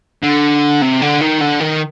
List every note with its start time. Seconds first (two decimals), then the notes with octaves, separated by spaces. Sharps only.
0.23 D3
0.82 C3
1.01 D3
1.21 D#3
1.41 D3
1.60 D#3